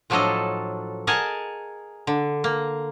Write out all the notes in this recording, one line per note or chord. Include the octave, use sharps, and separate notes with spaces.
A2 F3 F#3 D4 A4 D#5
G#4 A#4 D#5 F#5 G#5 A5
D3
A#3